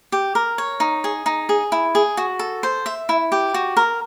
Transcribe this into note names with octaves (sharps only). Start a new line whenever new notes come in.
G4
A#4
C#5
D#4
G#4
D#4
G#4
E4
G#4
F#4
A4
C5
E5
E4
G4
F#4
A#4